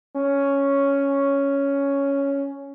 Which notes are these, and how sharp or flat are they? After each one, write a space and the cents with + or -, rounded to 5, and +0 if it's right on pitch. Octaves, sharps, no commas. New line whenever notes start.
C#4 +5